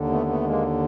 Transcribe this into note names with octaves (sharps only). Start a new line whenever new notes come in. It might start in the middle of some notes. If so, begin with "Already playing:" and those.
Already playing: D#2 D3
A3 B3
A3 B3
G#3 A#3